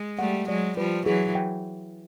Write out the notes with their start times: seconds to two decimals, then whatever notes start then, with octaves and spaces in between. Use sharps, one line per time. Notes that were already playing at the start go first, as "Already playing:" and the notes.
Already playing: G#3
0.19 G3 A3 F#5
0.48 F#3 G#3 D5
0.77 F3 G3 B4
1.06 E3 F#3 G#4
1.35 G5